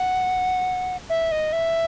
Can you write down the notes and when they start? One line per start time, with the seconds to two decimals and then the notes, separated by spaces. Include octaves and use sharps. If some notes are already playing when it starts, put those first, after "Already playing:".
Already playing: F#5
1.10 E5
1.32 D#5
1.52 E5